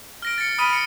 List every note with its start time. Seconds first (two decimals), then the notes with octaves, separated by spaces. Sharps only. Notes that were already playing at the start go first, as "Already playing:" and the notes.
0.22 F6 A#6 D7
0.38 A6 C#7
0.59 B5 D#6 F6 D#7
0.73 C#7